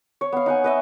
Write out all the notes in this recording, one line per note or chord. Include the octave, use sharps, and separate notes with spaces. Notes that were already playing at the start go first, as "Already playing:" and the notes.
C#5
B3 F5
D#4 F#5 G#5
B4 D#5 E5